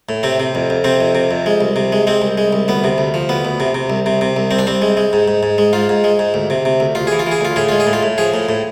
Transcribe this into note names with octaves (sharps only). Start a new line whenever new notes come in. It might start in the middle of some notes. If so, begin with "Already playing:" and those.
A2
C3 C4
C3
F2
F2
C3 C4
F2
C3
F2
G#3
C2
C3
G#3
G#3 C4
C2
G#3
C2
D2 B3
C3
D2
F3
D2 B3
D2
C3
C3
C2
C3
C3
C2
C2 C4
D4
C2 C4
G#3
G#3
G#2
G#2
G#2
G#3
G#2 F4
G#2
G#3
G#2
D2
C3
C3
D2
D2 F4
E3 G#4
F4
E3 G#4
D2 F4
A2 G#4
G#3 F4
G#4
A2
F4
A2
F3 G#4
A2
A2